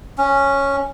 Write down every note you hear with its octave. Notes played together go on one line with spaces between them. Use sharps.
C#4